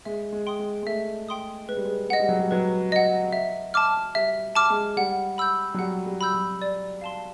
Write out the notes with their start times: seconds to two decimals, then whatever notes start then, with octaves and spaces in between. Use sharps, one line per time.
0.05 G#3 E5
0.32 G#3
0.46 G5 C6 D#6
0.59 G#3
0.83 G#3
0.87 A3 E5
1.29 G5 C6 D#6
1.69 G#3 B4
1.77 G3
1.85 G#3
2.10 G#3 D#5 F#5
2.20 G3
2.28 F#3
2.39 G3
2.51 F#3 B4
2.92 D#5 F#5
3.33 E5
3.74 A5 D6 F6
4.15 G3 E5
4.55 A5 D6 F6
4.70 G#3
4.97 G3 F#5
5.38 B5 E6 G6
5.74 F#3
5.79 G3 F#5
6.06 G3
6.21 B5 E6 G6
6.34 F#3
6.62 D5
7.01 F5 A5 C6